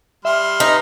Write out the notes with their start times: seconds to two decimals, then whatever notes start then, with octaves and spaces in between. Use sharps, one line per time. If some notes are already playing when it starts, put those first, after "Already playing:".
0.25 G3 E5 C6 F6
0.60 D#4 B4